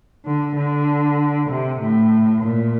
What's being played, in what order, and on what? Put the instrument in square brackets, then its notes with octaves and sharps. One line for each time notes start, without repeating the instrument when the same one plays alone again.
[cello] D3
D3
C3
A2
A#2